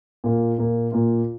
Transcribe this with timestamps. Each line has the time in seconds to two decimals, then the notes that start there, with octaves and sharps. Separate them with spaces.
0.24 A#2 A#3 F4
0.58 A#2 A#3 F4
0.92 A#2 A#3 F4